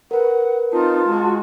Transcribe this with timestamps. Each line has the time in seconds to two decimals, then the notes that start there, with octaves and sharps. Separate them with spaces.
0.11 A#4 B4 F#5
0.72 C4 D#4 F4 A5
1.05 G#3 F#4